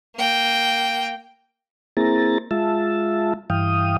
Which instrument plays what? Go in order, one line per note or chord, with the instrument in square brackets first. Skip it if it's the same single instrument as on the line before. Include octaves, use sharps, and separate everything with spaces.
[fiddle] A#3 G5
[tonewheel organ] A#3 C4 E4 G#4 A#5 A6
G#3 F4 E5 A5
G2 E3 F5 G5 D#6